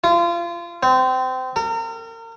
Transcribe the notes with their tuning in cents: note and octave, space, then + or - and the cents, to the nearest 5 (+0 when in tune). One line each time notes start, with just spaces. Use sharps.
F4 -30
C4 -25
A#4 -35